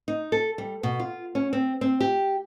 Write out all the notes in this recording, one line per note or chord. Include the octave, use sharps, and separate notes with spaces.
D#4
A4
G3
B2
F4
C#4
C4
C4
G4